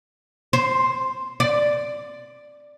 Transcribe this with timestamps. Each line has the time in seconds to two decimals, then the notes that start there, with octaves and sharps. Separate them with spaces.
0.53 C5
1.40 D5